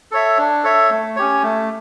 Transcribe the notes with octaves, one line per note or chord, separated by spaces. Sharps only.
A4 C#5 E5
D4
A4 C#5 E5
A3
C#4 G4 C#5
A3